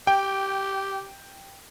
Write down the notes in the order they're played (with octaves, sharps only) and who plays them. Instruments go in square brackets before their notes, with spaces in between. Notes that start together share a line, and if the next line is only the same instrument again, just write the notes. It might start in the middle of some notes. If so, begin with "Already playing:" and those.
[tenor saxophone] G4 [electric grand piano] G5